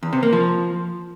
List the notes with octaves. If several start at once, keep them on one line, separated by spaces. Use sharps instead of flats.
E2
C3
A#3
F3